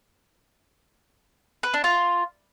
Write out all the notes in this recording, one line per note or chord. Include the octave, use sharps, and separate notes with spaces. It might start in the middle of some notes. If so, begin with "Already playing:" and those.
B4
D4
F4